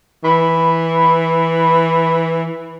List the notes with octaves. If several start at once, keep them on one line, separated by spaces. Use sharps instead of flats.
E3 B5